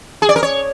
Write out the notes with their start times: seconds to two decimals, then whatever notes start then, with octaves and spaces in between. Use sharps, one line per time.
0.22 G#4
0.29 D5
0.36 A#4
0.43 C#5